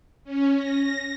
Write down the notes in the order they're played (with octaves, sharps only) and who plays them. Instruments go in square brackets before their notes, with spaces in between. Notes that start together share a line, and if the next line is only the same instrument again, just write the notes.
[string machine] C#4
A#6